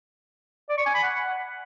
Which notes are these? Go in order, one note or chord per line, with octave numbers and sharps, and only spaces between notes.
D5
C#6
G#5
B5
F#5